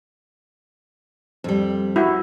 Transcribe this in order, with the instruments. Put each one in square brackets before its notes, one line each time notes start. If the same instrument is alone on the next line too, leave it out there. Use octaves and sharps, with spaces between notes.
[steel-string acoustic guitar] F2 G3
[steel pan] E4 F#4